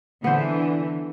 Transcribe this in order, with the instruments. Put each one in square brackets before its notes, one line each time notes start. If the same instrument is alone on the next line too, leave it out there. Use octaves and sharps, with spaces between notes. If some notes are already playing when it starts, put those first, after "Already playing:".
[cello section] D3 E3 [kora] B3 C5